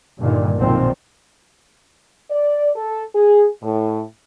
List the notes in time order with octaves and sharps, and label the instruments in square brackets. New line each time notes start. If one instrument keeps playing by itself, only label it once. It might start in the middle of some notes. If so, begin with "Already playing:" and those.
[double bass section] G2 A#2 D3 D#3
B1 A#2 D#3 F3 C4
[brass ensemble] D5
A4
G#4
A2